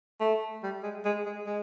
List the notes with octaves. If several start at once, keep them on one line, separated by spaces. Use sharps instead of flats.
A3
G3
G#3
G#3
G#3
G#3